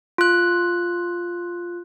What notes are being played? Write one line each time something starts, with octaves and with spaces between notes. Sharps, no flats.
F4 F#6